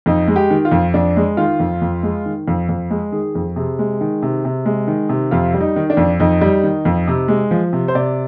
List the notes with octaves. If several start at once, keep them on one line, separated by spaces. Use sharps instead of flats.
F2 D#4
G#3
G4
D#3
F4
F2
F2 D4
G#3
D#3 F4
F2
F2
G#3
D#3
F2
F2
G#3
D#3 G#4
F2
C3 G#4
G#3
D#3
C3
C3
G#3
D#3
C3
F2 F4
G3
D#4
D#3
D4
F2
F2 D#4
G3
D#3
F2
C3
G#3
F3
C3
C5
C3 D5